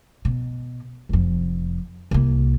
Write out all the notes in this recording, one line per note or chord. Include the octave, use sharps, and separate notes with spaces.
B2
F1 F2
C2 A#3